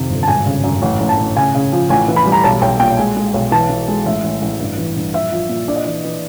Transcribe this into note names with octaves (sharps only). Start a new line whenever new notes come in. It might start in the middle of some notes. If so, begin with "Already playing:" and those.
Already playing: F2 C3 D#3
G1
A5
G#1 G#5
C#3
F#2
A1
A1
A5
A2
C#3 G#5
C#3
F3
A1 G#5
E3
B5
G3
A#5
B1 A5
B1 G5
A#2 G5
G#3 G#5
G#3
B1
E3 A5
E3
G#3
A1 E5
A1
A1
G2
E3
G2
A#1 E5
F3
A#2
D4 D5
D#5
E3 D5
E3